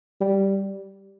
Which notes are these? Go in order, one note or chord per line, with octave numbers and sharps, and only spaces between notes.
G3